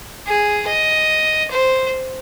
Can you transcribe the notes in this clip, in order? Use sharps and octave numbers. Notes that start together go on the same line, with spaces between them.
G#4
D#5
C5